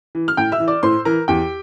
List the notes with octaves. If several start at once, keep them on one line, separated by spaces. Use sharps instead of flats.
E3
F6
A2 G5 G6
E5 E6
E3
D5 D6
A2 C5 C6
E3 A#4 A#5
E2 G4 G5